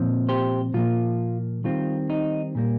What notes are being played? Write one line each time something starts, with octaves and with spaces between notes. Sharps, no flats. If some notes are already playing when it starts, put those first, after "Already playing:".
Already playing: A#2 F3 C4
G4 C5
A#2 F3 A#3 F4
D#3 G3 C4 F4
D#4
A#2 G3 A#3